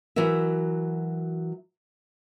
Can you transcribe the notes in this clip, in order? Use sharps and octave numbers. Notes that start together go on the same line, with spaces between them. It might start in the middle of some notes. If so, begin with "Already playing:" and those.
E3 F#3 F#4 A#4 E5